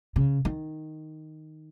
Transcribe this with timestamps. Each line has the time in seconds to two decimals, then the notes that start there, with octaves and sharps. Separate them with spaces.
0.16 C#3
0.45 D#3